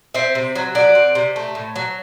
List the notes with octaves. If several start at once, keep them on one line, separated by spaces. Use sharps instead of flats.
C4 C5 E5
C3
F#3
C3 D5 F#5
C4
C3
A3
A2
F#3